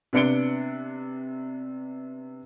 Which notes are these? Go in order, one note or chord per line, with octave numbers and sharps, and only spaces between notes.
C3 B3 D4 C#7 D7 G7